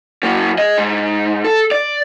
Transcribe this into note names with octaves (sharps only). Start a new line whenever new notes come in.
F#2 A#3
G#4 D#5
G#2
A4
D5